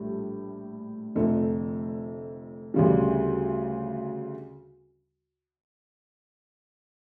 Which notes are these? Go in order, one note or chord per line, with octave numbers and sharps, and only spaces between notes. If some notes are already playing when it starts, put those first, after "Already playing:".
Already playing: A#1 A2 G3
F1 F2 D3 A3
D2 C#3 G3